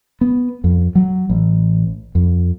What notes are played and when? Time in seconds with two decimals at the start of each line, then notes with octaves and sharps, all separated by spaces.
0.21 B3
0.64 F2
0.95 F#3
1.30 A1
2.15 F2